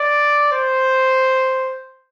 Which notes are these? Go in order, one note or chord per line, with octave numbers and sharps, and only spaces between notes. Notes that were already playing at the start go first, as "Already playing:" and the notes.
Already playing: D5
C5